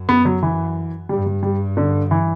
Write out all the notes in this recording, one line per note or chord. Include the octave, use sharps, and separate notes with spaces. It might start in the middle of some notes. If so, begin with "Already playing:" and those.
Already playing: F#2
B3
F#3
E3
G2 G3
G3
G3
D3
E3